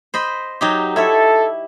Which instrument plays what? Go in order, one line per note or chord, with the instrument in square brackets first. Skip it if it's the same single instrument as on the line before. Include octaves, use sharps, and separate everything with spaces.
[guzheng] C5 D#5 B5
F#3 D#4 G4
[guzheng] E4 C#5 E5 [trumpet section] A4